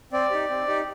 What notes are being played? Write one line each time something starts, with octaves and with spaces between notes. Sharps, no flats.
C4 D5
D#4 G4
C4
D#4 G4